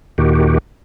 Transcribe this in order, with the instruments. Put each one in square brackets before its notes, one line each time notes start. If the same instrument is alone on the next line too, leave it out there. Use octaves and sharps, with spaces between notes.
[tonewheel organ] D#2 A#2 D#3 F#4 G4